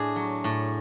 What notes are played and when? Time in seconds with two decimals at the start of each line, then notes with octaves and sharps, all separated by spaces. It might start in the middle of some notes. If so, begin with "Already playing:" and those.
Already playing: A2 D4 G#4
0.16 F#3
0.44 A2